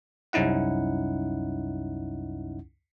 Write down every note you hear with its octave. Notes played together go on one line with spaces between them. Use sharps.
C2 F#2 C#4 D#4 E4 F#5